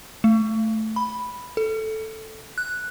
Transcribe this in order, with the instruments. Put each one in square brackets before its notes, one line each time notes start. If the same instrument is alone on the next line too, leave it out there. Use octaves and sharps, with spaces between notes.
[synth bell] A3
B5
A4
F#6